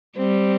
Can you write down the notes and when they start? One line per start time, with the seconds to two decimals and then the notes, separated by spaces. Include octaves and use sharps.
0.17 G3 C4